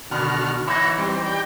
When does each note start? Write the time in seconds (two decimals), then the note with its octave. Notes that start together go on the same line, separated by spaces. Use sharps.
0.11 B2 D3 D#3 F#4 F6
0.67 E3 D#4 C#5 E5 F#5
0.98 G3 C4
1.26 G4 D5 G5